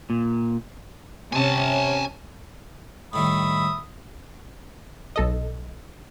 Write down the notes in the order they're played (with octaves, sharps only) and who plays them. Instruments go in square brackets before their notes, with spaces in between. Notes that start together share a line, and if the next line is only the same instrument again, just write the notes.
[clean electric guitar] A#2
[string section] C3 C#4 [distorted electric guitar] G#5 A5
[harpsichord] A2 D#3 G3 [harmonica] E5 B5 D#6
[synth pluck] B1 A4 D#5